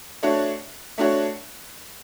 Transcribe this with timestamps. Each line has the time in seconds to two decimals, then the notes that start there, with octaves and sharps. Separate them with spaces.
0.23 A3 D4 F#4 C#5
0.98 A3 D4 F#4 C#5